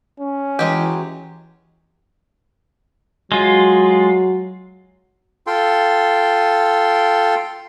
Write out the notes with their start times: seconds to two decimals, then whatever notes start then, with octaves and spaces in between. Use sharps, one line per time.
0.20 C#4
0.59 E3 F#3 G#3 G4
3.32 F#3 G#3 F4
5.47 F4 A4 G5 C6